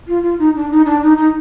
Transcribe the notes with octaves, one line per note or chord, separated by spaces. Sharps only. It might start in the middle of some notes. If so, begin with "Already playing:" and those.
F4
F4
D#4
D4
D#4
D4
D#4
D#4